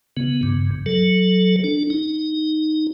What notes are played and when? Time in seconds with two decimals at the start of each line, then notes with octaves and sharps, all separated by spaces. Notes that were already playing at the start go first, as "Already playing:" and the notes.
0.17 C#3 B3
0.43 G2 C#3
0.86 F#3 A4
1.64 D4
1.90 D#4